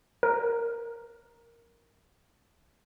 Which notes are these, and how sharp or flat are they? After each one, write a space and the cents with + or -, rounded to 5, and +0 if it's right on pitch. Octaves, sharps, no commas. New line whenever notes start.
A#4 +0